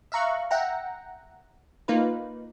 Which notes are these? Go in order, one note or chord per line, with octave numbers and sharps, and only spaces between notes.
E5 F5 A#5 C#6 F#6
E5 F#5 G5 A#5
A#3 D#4 F4 B4